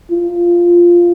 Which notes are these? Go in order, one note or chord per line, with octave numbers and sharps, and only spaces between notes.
F4